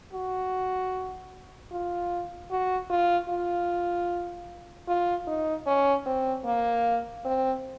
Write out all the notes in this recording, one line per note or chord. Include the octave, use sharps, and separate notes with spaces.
F#4
F4
F#4
F4
F4
F4
D#4
C#4
C4
A#3
C4